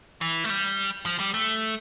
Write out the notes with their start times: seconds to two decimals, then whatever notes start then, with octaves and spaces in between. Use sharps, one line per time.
0.21 E3
0.44 A3
0.50 G3
1.06 F3
1.20 G3
1.34 A3